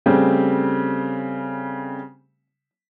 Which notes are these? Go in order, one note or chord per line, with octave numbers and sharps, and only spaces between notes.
C#3 G3 A3 C4